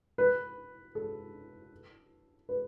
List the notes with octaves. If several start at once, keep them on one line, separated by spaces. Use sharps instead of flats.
B4
A4
B4